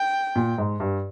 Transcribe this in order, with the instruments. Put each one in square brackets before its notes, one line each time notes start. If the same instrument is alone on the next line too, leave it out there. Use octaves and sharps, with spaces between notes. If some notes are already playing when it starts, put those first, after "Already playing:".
Already playing: [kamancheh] G5
[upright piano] A#2
G#2
G2